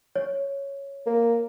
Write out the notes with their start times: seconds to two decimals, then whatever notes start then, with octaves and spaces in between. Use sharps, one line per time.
0.16 C#5
1.06 A#3